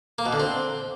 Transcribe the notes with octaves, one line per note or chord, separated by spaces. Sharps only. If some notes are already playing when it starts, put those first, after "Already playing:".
A#3
B2
D3
C4